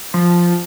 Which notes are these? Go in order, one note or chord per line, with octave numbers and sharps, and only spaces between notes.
F3